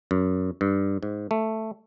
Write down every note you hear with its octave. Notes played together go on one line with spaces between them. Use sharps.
F#2
G2
G#2
A3